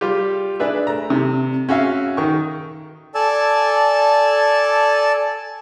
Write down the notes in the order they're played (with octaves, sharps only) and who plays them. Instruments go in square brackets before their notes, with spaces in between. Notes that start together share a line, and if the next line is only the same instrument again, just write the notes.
[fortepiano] G3 F4 G4
D4 G#4 B4 E5
A3 A#5
C3
C#4 F#4 E5 F5
D#3 C#6
[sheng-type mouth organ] A4 D5 G#5 A5 E6